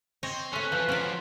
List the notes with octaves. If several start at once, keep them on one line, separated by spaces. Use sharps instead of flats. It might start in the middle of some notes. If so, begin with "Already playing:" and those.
C4 C#5 D#5
A3 C#4 A4 B4
E3 F3
F3 F#3 C#4 D5